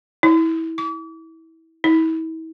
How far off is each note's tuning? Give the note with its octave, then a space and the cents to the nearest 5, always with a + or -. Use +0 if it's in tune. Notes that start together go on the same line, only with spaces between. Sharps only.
E4 -25
D6 -40
E4 -40